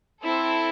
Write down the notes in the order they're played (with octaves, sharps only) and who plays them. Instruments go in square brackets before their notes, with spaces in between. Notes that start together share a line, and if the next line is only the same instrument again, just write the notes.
[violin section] C4 E4 A4